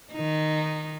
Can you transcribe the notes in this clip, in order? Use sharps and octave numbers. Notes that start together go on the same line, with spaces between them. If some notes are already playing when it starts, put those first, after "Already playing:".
D#3 D#4